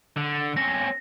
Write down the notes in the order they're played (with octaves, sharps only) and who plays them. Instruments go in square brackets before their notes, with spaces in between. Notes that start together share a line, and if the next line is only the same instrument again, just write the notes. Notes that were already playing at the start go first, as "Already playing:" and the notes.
[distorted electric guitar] D3
[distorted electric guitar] C4 C#4 [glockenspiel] A#6